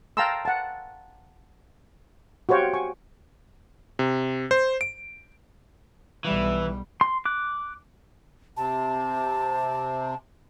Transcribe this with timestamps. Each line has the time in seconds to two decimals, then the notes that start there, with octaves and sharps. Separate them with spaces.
0.17 F5 G5 A5 A#5 C6 E6
0.45 F#5 A5
2.49 F#4 G4 C5 C#5 F5 G5
2.74 G#5 C#6
3.99 C3
4.51 C5
4.81 D7
6.25 B1 E3 G3
7.01 C6
7.26 D6 F#6
8.57 C3 A5